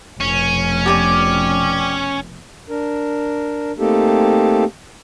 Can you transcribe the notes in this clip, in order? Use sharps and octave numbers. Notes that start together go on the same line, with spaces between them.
F1 B2 C#4
G4 D5 G#5
D4 A#4
A3 A#3 C4 D#4 G4 A4